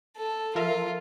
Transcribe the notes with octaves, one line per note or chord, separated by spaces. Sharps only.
A4
F3 F4 A#4 E5